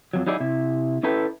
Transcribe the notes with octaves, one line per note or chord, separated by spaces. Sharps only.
F2 F#3
F#3 D#4 E4 G#4 D5
C3 E4
C#4 E4 A4 B4 G5